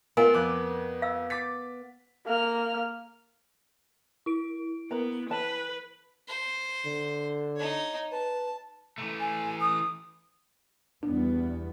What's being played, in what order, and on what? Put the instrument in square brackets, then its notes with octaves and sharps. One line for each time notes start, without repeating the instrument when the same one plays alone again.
[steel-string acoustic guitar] B3 [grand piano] F4 [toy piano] A#4 G#5
[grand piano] F2 D6 F#6
[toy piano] F5 E6
[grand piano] D6 A6 B6
[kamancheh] A#3 F6
[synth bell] E4 D7
[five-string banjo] A#3 B4 A#5 [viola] B3
[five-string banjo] E3 A5 B5 [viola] B4
[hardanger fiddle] C5
[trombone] D3
[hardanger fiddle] D#4 C#5
[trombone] B4 [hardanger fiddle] A5
[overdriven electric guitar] E3 A3
[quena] G#5
D#6
[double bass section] E2 G3 B3 [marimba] D4